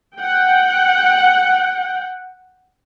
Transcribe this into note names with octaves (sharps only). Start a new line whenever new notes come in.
F#5 G5